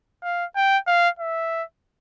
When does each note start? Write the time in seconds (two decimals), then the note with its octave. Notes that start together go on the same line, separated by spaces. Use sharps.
0.23 F5
0.56 G5
0.87 F5
1.19 E5